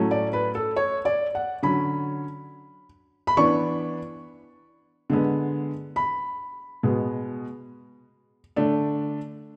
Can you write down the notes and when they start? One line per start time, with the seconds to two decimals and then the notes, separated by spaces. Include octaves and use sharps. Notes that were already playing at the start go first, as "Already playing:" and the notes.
Already playing: A2 F#3 A3 C#4
0.11 D5
0.33 B4
0.55 A4
0.76 C#5
1.05 D5
1.35 F#5
1.63 D3 F#3 C#4 B5
3.27 B5
3.37 E3 B3 D4 C#6
5.10 D3 G#3 B3
5.96 B5
6.83 B2 G#3 B3
8.56 D3 A3 D4